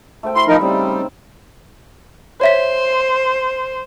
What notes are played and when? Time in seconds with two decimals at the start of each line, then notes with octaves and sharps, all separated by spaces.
0.23 A3 C5 G5
0.35 E4 G5 B5 C6
0.48 F3 D#4 A#4
0.60 C#3 G3 C4 D#4
2.41 C5 C#5 E5 B6